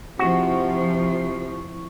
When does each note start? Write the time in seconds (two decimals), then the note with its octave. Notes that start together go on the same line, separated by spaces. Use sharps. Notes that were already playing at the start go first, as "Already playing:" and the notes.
0.19 C3 F3 E4 F#4 C#6